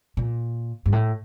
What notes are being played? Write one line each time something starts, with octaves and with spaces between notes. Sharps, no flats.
A#2
G2
A2